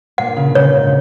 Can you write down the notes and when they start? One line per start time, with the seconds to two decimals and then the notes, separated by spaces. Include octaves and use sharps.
0.18 A#2 F#5
0.37 C#3
0.55 C#3 C#5
0.74 G#2